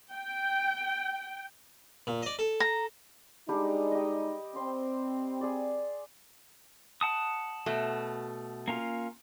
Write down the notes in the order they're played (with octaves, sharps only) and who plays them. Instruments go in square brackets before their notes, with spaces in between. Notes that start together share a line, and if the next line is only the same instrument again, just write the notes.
[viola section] G5
[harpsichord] A#2
D5 D#5
A4
[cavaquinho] A#5
[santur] G3 D4 G4 [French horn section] G#3 D#4
[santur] G4 D#5
[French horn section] C4 [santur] C6
[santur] G#4 D5
[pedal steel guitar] F#5 A5 D#6
[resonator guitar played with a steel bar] B2 A3
[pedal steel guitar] A#3 C#4 F4